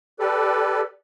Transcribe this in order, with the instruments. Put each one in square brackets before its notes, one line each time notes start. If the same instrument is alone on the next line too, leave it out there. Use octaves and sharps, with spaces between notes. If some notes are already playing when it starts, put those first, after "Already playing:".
[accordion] G4 A4 B4 D5